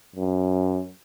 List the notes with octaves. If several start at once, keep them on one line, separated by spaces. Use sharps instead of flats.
F#2